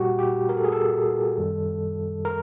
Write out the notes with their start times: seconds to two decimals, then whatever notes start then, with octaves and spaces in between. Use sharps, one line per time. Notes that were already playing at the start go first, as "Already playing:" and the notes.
Already playing: A#2 G3 F#4 G4
0.19 G4
0.49 A#4
0.57 A4
0.64 G#4
0.72 A4
1.38 F#2 D#3 G3
2.25 A#4